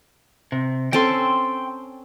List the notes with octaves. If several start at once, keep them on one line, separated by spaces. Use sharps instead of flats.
C3
C4 C#4 A4 G5 C6